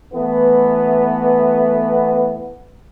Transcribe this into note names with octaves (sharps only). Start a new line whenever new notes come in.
E3 A3 B3